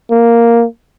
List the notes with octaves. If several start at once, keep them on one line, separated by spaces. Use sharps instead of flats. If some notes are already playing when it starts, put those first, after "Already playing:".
A#3